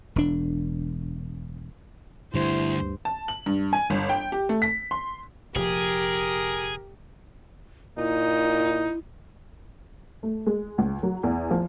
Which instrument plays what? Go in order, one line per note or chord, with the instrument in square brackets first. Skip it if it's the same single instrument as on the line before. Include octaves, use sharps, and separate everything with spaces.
[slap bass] E1 D4
[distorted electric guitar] D2 [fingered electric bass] G2 [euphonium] E4 [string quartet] C5
[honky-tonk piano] A5
F#7
G2
G#5
G1
G5
G4
A3
B6
C6
[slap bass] F1 A#2 F3 [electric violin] G4 [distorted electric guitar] G#4 [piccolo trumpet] A#4
[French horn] A#2 [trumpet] D#4 [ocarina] E4
[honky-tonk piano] A3
G#3
C#2
F#3
E2
F3